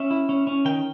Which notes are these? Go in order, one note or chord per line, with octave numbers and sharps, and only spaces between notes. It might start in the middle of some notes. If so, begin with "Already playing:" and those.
Already playing: C#4 E5
E4
C#4
C#4
D#3 G5